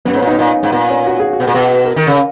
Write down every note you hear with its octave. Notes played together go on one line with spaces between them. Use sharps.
F#2 B3
G#2
C#4
A#2
D#4
B2
A#2 D#4
G#2
A#2 B3
C#4
F#4
G#4
F#4
B2
A#2 G#4
B2
F#4
A#4
D#3 A#4
C#3